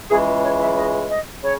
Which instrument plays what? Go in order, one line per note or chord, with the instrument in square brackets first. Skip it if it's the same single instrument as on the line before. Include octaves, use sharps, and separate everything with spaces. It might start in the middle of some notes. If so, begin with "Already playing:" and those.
[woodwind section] C#2 C#3 E3 G#3 G#4
C#5
E5
D#5
D#5
C#3 C#5